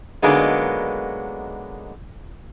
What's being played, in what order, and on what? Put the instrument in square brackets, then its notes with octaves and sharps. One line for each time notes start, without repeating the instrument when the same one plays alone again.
[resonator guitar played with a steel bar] D3 F#3 G#3 A#3 B3 D#4